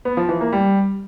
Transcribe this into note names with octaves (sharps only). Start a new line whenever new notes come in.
B3
F3
E3
A#3
G3